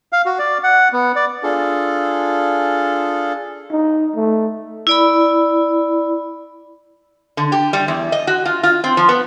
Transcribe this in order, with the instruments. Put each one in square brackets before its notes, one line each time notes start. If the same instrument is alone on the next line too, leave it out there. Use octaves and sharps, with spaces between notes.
[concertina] F5
F#4
D5
F#5
B3
D5
[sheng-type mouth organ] D4 F4 G#4 A4
[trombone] D#4
A3
[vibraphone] E4 D5 B5
[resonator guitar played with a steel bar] D3
G4
G3
E2
D#5
F#4
F4
F4
C4
F3
B3